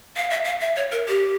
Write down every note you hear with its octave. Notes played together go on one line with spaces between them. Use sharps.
F5
E5
F5
E5
C#5
A#4
G4